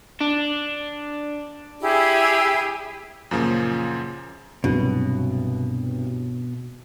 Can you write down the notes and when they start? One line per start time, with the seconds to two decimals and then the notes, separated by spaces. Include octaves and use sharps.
0.21 D4
1.80 E4 G4 G#4
3.31 F#2 A#2 C#3 F3 A#3
4.64 C2 G2 B2 F#3